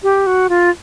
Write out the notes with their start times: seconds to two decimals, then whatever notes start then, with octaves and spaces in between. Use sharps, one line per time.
0.03 G4
0.27 F#4
0.49 F4